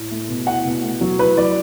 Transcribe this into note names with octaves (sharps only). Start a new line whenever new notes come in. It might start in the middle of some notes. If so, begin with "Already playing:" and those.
Already playing: A2
A3
B2
E4 F#5
B2
A3
F#3
E4 B4
F#3 D5